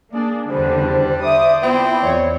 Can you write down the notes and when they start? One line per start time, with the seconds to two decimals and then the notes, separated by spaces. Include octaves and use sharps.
0.12 A#3 D4 G#4 D5
0.50 E2 G2 D3 G3 D4 C5
1.23 C5 D5 E5 D6 D#6
1.63 B3 C4 E4 F4
2.02 E2 C#5 D5